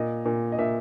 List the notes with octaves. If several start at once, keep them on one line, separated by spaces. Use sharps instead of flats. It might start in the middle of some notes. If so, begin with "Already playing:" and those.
Already playing: A#2 D#5
A#2
D#5
A#2 E5